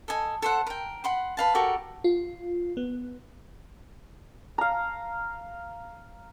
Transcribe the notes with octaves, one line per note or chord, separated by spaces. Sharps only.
A4 D#5 G#5
A4 C5 F#5
A#4 G5
F#5 B5 C6
B4 F5 A5
F#4 G4 A4 A#4
F4
B3
F5 A#5